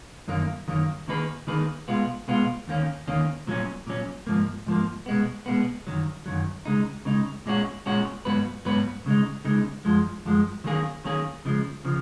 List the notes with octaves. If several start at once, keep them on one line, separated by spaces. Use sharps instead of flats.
F#2 D#3 F#3 A#3
F#2 D#3 F#3 A#3
D#3 A#3 D#4 G#4 B4
D#3 A#3 D#4 G#4 B4
B2 G#3 B3 F4
B2 G#3 B3 F4
D#2 D#3 A#3 C#4
D#2 D#3 A#3 C#4
A#2 F#3 C#4
A#2 F#3 C#4
G#2 F3 A#3
G#2 F3 A#3
B2 G#3 B3
B2 G#3 B3
F#2 D#3 F#3
F#2 D#3 F#3
C#3 G#3 D#4
C#3 G#3 D#4
A#2 G#3 C#4 F#4
A#2 G#3 C#4 F#4
G#2 F#3 B3 F#4 B4
G#2 F#3 B3 F#4 B4
C#3 G#3 D#4
C#3 G#3 D#4
F#2 F3 G#3
F#2 F3 G#3
D#3 F#3 A#3 C#4 G#4
D#3 F#3 A#3 C#4 G#4
C#3 F3 G#3
C#3 F3